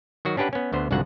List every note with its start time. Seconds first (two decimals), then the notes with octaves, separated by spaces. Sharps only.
0.25 D#3 F#3 F#4
0.37 C#4 D4 G4 B4 F#5
0.53 B3 C#4
0.72 D2 D3 B3 C5
0.91 C2 F2 G#2 D3 F#4 F#5